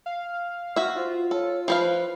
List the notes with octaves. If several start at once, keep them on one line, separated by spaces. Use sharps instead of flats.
F5
F#4 E5
F4 C5
A4 C#5
F3 B4 C5 F5